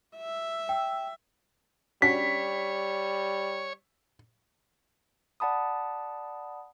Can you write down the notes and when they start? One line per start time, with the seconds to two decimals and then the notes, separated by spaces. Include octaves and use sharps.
0.17 E5
0.69 G5 E6
2.02 G3 C#4 D4 F#4 C#5 B6
5.40 D5 F#5 A5 B5 D#6